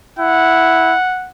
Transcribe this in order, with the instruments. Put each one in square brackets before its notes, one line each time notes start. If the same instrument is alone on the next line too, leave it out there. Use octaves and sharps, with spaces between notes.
[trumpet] E4 [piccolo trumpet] F#5